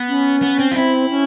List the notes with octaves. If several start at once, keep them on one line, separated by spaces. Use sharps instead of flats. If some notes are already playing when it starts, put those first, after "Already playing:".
Already playing: B3
C#4
B3
C4
F4
C4 E4
C#4